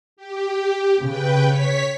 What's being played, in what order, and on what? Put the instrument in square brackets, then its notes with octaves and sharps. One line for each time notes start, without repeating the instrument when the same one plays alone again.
[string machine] G4
[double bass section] C#3 [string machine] B4 G5
[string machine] C#5 B6